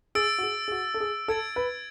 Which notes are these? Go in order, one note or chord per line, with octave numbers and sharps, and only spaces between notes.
G#4 E6 A6 D7
F#4
G#4
G#4
F#4
A4
G#4
A4 E6 G#6 D7
B4